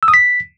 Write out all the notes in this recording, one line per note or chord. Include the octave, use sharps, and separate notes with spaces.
E6
D#6
B6